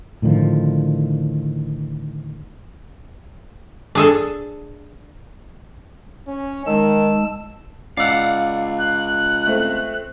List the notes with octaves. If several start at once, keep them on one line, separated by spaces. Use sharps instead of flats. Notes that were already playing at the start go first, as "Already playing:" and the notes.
A2 D3 D#3 F3
D4 G#4 A4
C#4
D#3 G#3 A5 E6
C#2 D5 F5 F#5 E6
F#6
A3 C4